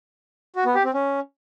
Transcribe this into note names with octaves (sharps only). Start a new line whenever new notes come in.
F#4
B3
G4
C4
C#4